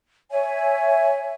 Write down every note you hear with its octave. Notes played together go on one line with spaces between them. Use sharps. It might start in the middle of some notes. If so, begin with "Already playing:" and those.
C#5 E5 G#5